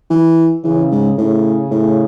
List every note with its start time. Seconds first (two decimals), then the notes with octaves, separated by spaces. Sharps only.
0.10 E3
0.64 C#3 E3
0.92 G#2
1.18 A2 C#3
1.71 A2